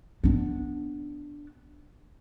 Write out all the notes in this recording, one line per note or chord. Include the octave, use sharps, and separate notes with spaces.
B3 D4